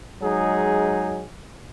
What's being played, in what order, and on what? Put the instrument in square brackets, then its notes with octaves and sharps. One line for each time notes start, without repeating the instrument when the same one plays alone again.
[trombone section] F#3 G#3 D#4 G#4